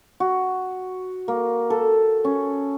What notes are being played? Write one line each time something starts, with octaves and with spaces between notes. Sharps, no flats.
F#4
A#3
A4
C#4